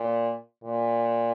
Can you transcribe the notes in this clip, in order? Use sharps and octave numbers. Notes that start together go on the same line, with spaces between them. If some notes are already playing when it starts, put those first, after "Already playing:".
Already playing: A#2
A#2